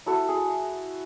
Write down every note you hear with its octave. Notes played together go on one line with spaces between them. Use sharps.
E4 F#4 A4
G#4